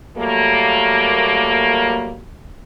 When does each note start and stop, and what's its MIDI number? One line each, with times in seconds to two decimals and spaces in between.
0.17 2.20 54
0.17 2.20 55
0.17 2.20 57
0.17 2.20 58